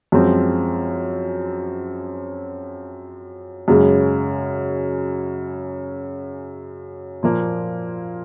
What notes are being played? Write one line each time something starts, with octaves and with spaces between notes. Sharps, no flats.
F#2 F3 G#3 C4
F#2 C#3 G#3
A#2 F3 A#3